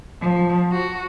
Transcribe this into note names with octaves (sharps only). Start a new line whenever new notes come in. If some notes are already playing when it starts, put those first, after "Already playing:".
F3
F#4